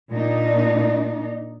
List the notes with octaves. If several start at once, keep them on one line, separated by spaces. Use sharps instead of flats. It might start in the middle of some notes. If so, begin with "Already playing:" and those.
A#2 D4 D#4